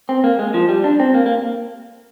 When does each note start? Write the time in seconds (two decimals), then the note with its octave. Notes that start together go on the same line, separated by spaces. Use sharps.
0.09 C4
0.24 A#3
0.39 G#3
0.54 F3
0.69 G3
0.84 D4
1.00 C4
1.14 A#3
1.26 A#3